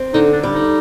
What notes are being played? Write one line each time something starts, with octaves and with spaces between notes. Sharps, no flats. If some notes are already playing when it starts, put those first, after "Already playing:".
Already playing: C4
D3 D#4
D4
G3
D#4